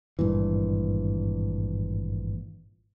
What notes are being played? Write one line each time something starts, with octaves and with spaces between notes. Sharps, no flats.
G#1 G2 A#2 E3